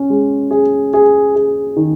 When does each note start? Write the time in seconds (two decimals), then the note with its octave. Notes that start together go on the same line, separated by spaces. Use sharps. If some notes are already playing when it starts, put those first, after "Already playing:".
Already playing: C#4
0.10 G#3
0.51 G#4
0.94 G#4
1.35 G#4
1.77 D#3